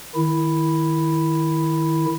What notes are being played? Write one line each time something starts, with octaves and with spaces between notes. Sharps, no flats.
D#3 E4